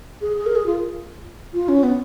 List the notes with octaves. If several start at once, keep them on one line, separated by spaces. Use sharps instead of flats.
G#4
G#4
A#4
G#4
F4
F4
C#4
B3